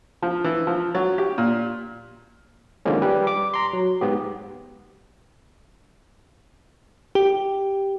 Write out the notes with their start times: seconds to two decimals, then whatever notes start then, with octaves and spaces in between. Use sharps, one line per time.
0.22 F3
0.44 E3
0.67 F3
0.95 F#3
1.18 G4
1.38 A#2
2.85 D3 D#3 F3 G#3 A#3 C#4
3.02 G3 G4 B4
3.27 D6
3.54 A#5 C6
3.73 F#3
4.01 G#2 B3 G4
7.15 G4